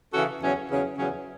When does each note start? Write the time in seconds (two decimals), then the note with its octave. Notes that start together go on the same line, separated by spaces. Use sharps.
0.13 C#3 E3 C#4 F#4 A4
0.41 E2 C#3 F#3 C#4
0.70 E2 C#3 F#3 C#4
0.97 E2 C#3 F#3 C#4